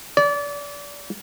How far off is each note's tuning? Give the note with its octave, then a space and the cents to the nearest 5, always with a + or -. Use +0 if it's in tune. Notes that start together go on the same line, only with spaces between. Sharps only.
D5 -30